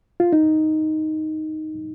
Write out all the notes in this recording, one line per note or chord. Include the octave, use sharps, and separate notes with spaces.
F4
D#4